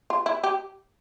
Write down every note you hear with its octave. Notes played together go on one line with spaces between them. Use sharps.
F4
E4
G4